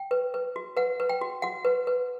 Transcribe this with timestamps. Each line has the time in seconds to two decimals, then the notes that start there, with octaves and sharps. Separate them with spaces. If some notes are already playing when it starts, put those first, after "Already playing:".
Already playing: G5
0.11 B4
0.34 B4
0.56 F#4
0.77 B4 F#5
1.00 B4
1.09 G5
1.21 F#4
1.42 F#4 F#5
1.65 B4
1.87 B4